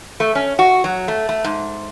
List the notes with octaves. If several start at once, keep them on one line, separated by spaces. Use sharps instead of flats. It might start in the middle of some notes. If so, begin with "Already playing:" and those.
A3
C#4
F#4
F#3
A3
A3
G#2